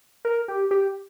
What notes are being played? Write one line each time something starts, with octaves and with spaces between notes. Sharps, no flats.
A#4
G4
G4